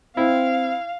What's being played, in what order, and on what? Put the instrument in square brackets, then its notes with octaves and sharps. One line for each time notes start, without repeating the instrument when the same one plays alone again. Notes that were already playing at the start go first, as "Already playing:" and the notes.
[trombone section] C4 [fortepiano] E4 [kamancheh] F5